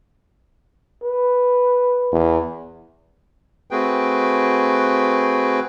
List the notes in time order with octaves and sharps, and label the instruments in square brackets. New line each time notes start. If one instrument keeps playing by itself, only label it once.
[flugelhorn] B4
[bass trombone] E2
[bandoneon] A3 C4 F#4 G#4 B4 G5